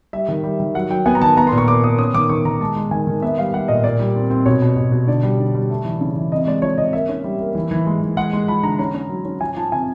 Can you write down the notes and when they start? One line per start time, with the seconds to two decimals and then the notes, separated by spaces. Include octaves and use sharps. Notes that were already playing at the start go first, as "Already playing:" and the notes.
0.13 G3 E5
0.28 D#3
0.43 G3
0.60 D#3
0.74 F#3 F#5
0.90 F#3 G5
1.06 B3 G#5
1.15 A#5
1.21 D#3 A5
1.37 B3 A#5
1.47 A#2 C6
1.58 C#6
1.68 A#2 D6
1.84 B3 D#6
1.98 C#4 D#6
2.14 D#3 D6
2.29 D#3 C#6
2.45 D#3 A#5
2.60 G#3 A5
2.76 G#3
2.91 D#3 G#5
3.07 D#3
3.22 B3 E5
3.37 G3 F5
3.53 G3 F#5
3.68 A#2 D#5
3.84 A#2 D5
4.00 G3
4.15 C4
4.30 C4
4.46 B2 C#5
4.62 B2
4.76 B2
4.92 B2
5.07 D3 D5
5.23 G3
5.39 D3
5.55 G3
5.70 A3
5.85 E3
6.01 C#3
6.16 E3
6.32 C3 D#5
6.47 G#3 D5
6.62 F3 C#5
6.77 C3 D#5
6.93 A#3 E5
7.09 C#4
7.24 G3
7.40 A#3
7.55 E3
7.71 E3
7.86 G#3
8.02 E3
8.17 G#3 F#5
8.33 G#3
8.48 F3 B5
8.63 D3 A#5
8.79 C#4 A#5
8.95 C#4
9.09 F#3
9.25 C#4
9.40 F3 G#5
9.57 F3 A5
9.72 C3 G#5